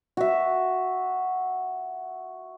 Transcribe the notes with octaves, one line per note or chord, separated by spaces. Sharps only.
F#4 E5